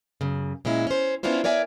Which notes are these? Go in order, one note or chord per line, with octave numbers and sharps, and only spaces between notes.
F#2 C#3
A#2 G#3 C#4 E4
C#4 C5
B3 C#4 D4 E4 F4 C5
A#4 C#5 D5 E5 G#5